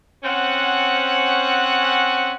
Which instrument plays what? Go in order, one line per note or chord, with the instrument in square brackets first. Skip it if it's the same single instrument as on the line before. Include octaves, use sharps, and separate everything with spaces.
[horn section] C4 C#4 F#5